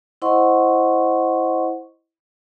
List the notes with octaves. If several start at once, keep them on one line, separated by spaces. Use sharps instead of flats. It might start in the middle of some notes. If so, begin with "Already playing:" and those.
E4 C5 D#5 F#5 C6 C#6